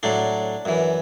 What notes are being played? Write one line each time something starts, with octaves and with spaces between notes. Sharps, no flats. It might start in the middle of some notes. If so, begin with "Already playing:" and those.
A2 F#3 D4
F#2 E3